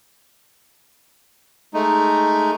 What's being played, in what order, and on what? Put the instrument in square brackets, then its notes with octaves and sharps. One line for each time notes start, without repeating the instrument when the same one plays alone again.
[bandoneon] G#3 A3 D#4